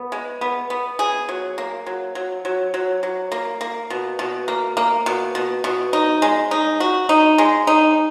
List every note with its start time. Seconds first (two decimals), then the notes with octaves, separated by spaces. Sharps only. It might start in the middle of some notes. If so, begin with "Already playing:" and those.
Already playing: B3
0.12 G#3
0.41 B3
0.70 B3
0.99 G#4
1.29 F#3
1.58 A#3
1.86 F#3
2.15 F#3
2.45 F#3
2.74 F#3
3.03 F#3
3.32 A#3
3.61 A#3
3.90 B2
4.19 B2
4.48 A#3
4.77 A#3
5.06 B2
5.35 B2
5.64 B2
5.93 D#4
6.22 G#3
6.51 D#4
6.80 F#4
7.09 D#4
7.38 G#3
7.67 D#4